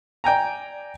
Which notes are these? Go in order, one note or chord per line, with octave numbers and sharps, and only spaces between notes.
D5 G5 G#5 A#5